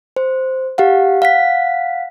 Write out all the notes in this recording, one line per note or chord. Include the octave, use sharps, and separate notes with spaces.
C5
G4 F5 F#5
F5 F#5 B6